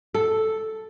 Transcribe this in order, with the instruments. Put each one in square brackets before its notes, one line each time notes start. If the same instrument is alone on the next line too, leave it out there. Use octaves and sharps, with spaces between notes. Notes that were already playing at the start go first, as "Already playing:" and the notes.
[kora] A4